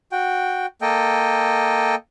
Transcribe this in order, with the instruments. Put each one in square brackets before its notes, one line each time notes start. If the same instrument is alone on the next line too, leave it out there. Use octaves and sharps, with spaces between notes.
[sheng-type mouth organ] F#4 G5
A#3 A4 D#5 G5